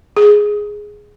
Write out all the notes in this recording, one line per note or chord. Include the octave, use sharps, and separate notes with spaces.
G#4